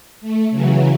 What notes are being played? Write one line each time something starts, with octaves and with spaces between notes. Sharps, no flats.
A3
C#3 E3 F#3